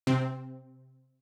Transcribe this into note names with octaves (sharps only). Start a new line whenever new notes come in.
C3 C4